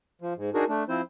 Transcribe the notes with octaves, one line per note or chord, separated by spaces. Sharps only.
F3
G#2
D4 D#4 F#4 G#4 A#4
A3 D4
F3 C4 E4 C5